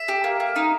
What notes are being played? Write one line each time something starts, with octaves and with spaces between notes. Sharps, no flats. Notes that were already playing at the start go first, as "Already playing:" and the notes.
Already playing: E5
G4
A#3
A#3
D#4